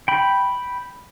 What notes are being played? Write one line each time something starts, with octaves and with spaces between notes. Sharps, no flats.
G5 B5